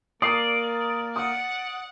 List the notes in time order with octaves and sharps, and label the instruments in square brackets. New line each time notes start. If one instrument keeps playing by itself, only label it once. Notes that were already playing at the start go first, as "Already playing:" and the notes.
[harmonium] A#3 A#4 [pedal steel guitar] D5 [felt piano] D#6 C7
[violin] F#5 [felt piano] D#6